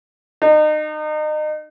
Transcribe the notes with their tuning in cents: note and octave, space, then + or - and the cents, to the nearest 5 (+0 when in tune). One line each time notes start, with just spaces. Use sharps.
D#4 -30